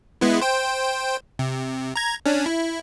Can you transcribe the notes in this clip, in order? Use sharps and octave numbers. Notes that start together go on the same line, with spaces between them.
G#3 B3 E4
C5 G5
C3
A#5 G#6
C#4 D4
E4